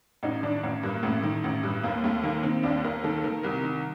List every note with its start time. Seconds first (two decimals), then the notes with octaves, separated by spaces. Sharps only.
0.23 A1 D#4
0.43 D#3 D4
0.63 A1
0.83 G2 A#3
1.03 A1 A3
1.23 D#3
1.44 A1
1.63 G2
1.83 D#2 A#3
2.04 D#2 A3
2.23 D#3 A#3
2.43 D#3 C4
2.63 D#2 D4
2.84 D#2 A#4
3.04 D#3 A4
3.24 D#3 A#4
3.43 C2 A#4
3.63 D#3